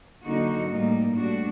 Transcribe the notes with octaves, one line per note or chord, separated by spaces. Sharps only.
D3 F#3 A#3 D#4 F#4
A2 G3 A#3 D#4
A2 G3 D4 F#4